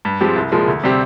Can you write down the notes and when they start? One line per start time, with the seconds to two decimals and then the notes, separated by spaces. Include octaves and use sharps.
0.05 G2
0.21 F3 G#3 C4 G4
0.36 C2
0.52 A#2 F3 G#3
0.68 D2
0.84 C3 G3 C4 G4